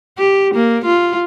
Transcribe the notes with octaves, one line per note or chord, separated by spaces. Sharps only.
G4
A#3
F4